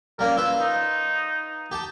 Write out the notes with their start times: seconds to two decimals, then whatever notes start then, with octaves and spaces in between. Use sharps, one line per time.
0.19 G3 A#3 C#4 A#4
0.37 F4 B4 E6
0.60 D#4
1.71 G4 G5 A5